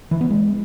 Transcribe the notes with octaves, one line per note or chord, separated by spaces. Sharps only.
E3
B3
G#3